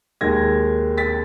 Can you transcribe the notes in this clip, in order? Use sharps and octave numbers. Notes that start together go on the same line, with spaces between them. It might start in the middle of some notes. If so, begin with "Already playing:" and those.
D#2 D#3 G#3 G#6 A#6
A6 B6